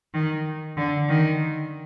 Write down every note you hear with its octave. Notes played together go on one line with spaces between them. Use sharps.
D#3
D3
D#3